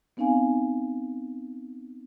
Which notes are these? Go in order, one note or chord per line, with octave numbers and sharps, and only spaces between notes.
B3 C4 D#4 F5 G#5